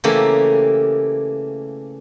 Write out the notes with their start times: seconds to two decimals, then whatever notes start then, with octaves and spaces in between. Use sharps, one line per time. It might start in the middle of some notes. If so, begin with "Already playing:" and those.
0.04 C#3 E3 A3 A#3 G4